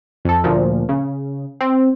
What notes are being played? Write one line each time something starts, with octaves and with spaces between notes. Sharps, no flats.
F2 A4
D2 A#2 F3
C#3
C4